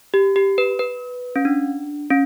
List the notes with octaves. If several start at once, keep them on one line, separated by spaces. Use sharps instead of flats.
G4
G4
B4
B4
C#4
D4
C#4